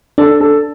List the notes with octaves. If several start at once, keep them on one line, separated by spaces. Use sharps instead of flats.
D4 A4
A4